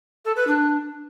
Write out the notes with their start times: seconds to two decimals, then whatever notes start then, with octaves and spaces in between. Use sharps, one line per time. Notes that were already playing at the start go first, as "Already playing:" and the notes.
0.25 A4
0.36 B4
0.47 D4